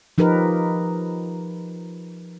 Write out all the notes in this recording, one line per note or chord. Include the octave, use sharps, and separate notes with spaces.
F3 D#4 G4 A#4 B4